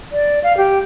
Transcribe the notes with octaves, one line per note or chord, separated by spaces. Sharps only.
D5
F5
G4